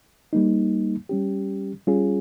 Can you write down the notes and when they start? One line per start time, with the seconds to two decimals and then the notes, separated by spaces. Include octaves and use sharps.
0.33 G3 A#3 D#4
1.09 G3 C#4 G4
1.87 G3 C#4 F4 G#4